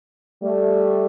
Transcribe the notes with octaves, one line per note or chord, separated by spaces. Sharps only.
G3 A3